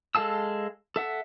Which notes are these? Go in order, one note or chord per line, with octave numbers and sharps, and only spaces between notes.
G#3 A4 F5 A5 E6
A4 E5 F#5